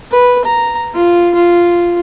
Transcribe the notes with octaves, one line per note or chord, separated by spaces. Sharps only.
B4
A#5
F4
F4